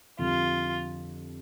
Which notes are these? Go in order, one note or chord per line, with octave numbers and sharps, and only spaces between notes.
F2 D3 G3 F4